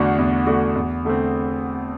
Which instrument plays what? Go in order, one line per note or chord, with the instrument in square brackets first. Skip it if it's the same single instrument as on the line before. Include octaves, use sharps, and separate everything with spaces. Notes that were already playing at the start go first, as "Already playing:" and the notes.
Already playing: [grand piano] E2 D3 A3 D4 F#4
E2
D3 A3 D4 F#4
E2
D3 A3 C4